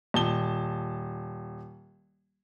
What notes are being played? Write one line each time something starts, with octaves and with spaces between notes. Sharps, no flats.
D#1 A5 G7